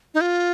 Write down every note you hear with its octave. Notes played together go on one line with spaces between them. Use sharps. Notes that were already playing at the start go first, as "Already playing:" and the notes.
D#4
F4